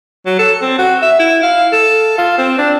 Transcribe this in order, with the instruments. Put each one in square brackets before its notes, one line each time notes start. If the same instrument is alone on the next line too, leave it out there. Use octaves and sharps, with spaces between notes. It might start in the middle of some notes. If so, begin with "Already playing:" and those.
[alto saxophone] F#3
A4
C4
F#4
E5
E4
F5
A4
F4
C4
D4